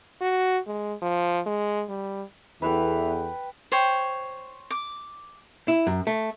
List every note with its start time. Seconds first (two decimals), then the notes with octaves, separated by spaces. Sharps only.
0.21 F#4
0.67 G#3
1.02 F3
1.46 G#3
1.89 G3
2.62 E2 E3 A4 B4 G5
3.72 C5 C#5 G5
4.70 D6
5.68 E4
5.87 F#2
6.07 A3